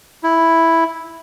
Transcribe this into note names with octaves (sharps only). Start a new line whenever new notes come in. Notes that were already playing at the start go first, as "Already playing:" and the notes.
E4